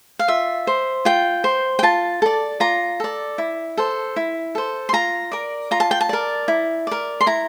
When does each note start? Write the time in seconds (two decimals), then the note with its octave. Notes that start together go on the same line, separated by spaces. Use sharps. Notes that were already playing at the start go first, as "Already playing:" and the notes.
0.19 F5
0.28 F4 E5
0.67 C5
1.05 F4 G5
1.44 C5
1.79 G5
1.83 F4 A5
2.22 A4 D5
2.60 F4 A#5
3.00 A4 D5
3.38 E4
3.77 A4 C5
4.16 E4
4.55 A4 C5
4.89 C6
4.93 F4 A#5
5.32 A#4 D5
5.71 F4 A#5
5.80 A5
5.91 G5
6.01 A5
6.09 A#4 D5
6.48 E4
6.87 A#4 D5
7.21 C6
7.26 E4 A#5